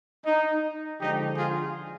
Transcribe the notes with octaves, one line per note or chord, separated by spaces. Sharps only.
D#4
D3 F3 G#3 D#4 G4
F4 G#4